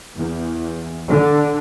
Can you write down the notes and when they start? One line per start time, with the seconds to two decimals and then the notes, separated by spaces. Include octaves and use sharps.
0.16 E2
1.10 D3